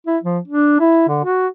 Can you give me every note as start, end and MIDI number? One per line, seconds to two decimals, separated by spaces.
0.07 0.18 64
0.23 0.39 53
0.48 0.76 62
0.80 1.06 64
1.08 1.19 50
1.24 1.47 66